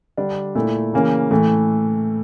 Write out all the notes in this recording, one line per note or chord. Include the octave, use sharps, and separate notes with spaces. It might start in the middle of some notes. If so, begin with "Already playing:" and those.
D3 G3 D4
A#2 A3 E4
C#3 E3 A#3 C#4
A2 E3 A3